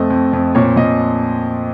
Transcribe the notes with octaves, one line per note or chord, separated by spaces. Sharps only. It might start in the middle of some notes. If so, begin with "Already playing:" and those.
Already playing: F2 A3 D#5
F2
F2
A#2 C#5
A#2 D#5